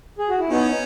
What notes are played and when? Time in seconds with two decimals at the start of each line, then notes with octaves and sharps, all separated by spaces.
0.19 G#4
0.29 F#4
0.39 E4
0.50 B3 C#4 D#4